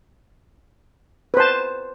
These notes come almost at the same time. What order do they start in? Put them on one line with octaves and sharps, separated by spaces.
B4 C5 A5